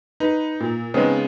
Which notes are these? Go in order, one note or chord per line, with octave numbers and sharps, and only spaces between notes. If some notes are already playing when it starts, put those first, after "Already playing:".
D#4 B4
A#2
C#3 G#3 B3 C4 D#4